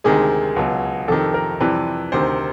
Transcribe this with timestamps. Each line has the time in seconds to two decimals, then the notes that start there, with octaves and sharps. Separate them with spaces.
0.04 D2 C3 D#3 G#3 G#4
0.56 C#2 B2 F#3
1.08 F2 C3 D#3 A4
1.34 A#4
1.60 F2 C3 E3 G3 B4
2.12 D2 C3 D#3 C5